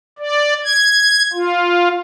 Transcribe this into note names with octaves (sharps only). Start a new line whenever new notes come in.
D5
G#6
F4